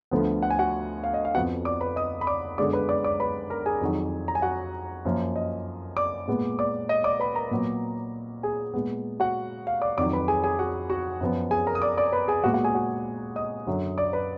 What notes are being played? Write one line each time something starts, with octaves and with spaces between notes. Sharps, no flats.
D2 D3 F3 B3
F#5
G#5
F#4 F#5
F5
D#5
F5
F2 F3 B3 F#4 F#5
D5 D6
B4 B5
D#5 D#6
B5
D5 D6
F#2 D3 G#3 B3 D5 D6
B4 B5
D5 D6
D5 D6
B4 B5
A#4 A#5
G#4 G#5
F2 D#3 F#3
A#5
G#5
F#4 F#5
F#2 F3 A#3
D#5
D5 D6
A#2 G#3 B3
D5 D6
D#5 D#6
D5 D6
B4 B5
A#4 A#5
A#2 F#3 B3
G#4 G#5
A#2 G#3 B3
F#4 F#5
F5
D5 D6
F2 D#3 F#3 D5 D6
B4 B5
G#4 G#5
G#4 G#5
F#4 F#5
F#4 F#5
F#2 F3 B3
G#4 G#5
A#4 A#5
D#6
D5 D6
D5 D6
B4 B5
G#4 G#5
A#2 G#3 B3 F#4 F#5
F#4 F#5
G#4 G#5
F#4 F#5
D#5 D#6
F#2 D3 F#3
D5 D6
B4 B5